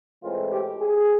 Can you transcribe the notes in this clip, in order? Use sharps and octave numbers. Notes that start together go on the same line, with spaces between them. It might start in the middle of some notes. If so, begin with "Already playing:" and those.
A2 E3 G#3 C4 F4
G4
G#4